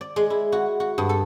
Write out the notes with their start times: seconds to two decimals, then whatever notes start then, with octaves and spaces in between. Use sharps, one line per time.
0.01 D5
0.16 G#3
0.30 E4
0.52 F#4
0.80 F#4
0.98 G2
1.09 A4